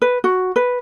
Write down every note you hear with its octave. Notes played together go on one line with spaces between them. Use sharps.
B4
F#4
B4